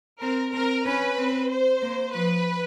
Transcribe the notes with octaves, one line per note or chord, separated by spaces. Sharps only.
C4 A#4
C4 A#4
C#4 B4
C4
C5
A#3
F3 B4